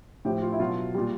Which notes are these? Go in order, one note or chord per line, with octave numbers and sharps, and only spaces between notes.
A2 F3 G4
F4
E4
B2 F#3 F4
A#2 G3